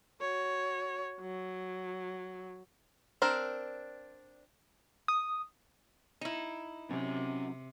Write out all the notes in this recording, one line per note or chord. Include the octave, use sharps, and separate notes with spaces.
F#4 C#5
F#3
C4 D4 A#4
D#6
D#4 E4
C3 F#3 C#4